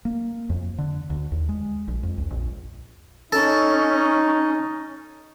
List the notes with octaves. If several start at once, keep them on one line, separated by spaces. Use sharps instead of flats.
A#3
F2
D3
D2
D#2
G#3
A#1
F2
C#2
A#1
C#4 D#4 A4